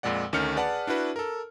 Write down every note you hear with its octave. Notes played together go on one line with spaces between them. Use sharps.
F2 A#2 G#3 D5 F#5
D2 D#3 A3 C#4 F6 C#7
G#4 B4 D5 F#5 A5
D4 E4 F#4 B4
A4 A#4